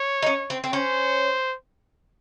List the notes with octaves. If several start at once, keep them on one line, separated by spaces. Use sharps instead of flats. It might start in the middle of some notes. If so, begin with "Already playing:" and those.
Already playing: C#5
D#4
C#4
C4
C4
C#4 C5